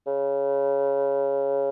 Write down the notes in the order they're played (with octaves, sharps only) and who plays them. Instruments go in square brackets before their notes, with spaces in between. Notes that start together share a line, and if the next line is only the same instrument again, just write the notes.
[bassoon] C#3